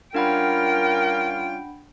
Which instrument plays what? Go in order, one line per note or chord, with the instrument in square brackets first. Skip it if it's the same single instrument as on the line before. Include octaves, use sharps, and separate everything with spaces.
[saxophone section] G3 C#4 F4 [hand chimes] D4 F#5 B5 [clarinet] A#4 [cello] G5